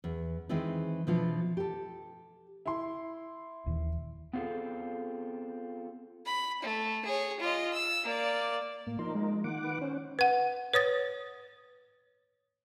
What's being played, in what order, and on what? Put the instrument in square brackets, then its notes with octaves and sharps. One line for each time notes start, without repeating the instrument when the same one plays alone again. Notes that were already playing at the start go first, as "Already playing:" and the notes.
[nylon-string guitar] E2
D#3 E3 G#3 C4 E4
B2 E3 F3 D4 F4
G4 A4
[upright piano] E4 C6
[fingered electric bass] D#1 D#2 E3
[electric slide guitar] B3 C4 F4 G#4 A4
[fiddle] B5
A3
G#4 C#5
F4 D#5
E6
A#3 D5
[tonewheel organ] A2 [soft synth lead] A#3
[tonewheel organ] F3 D#4 A#4 [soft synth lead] C6
[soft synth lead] G#3
[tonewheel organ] D#3 F#5 D6 [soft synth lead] A#3
[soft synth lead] B4
[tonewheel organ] C#4 [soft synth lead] C5
[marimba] B4 F#5
B4 C#5 D#6 A6